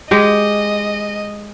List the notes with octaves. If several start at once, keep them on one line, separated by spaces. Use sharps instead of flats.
G#3 G4 D#5